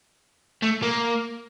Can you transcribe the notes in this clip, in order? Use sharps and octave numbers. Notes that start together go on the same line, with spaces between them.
A3
A#3